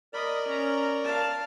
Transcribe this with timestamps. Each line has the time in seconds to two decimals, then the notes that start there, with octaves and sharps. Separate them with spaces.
0.13 A#4 D5 D#5 B5
0.47 C#4 A#5
1.04 F5 A5